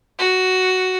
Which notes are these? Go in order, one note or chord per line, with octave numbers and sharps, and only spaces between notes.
F#4